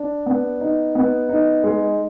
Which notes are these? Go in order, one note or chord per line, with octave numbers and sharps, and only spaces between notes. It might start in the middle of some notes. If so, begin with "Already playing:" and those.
Already playing: D4
B3
D#4
B3
D#4
G#3